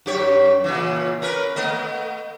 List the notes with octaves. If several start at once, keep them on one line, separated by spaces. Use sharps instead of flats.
F#2 G4 C#5
A#2 C#3 E3
C#4 A#4 B4
A3 B3 D#5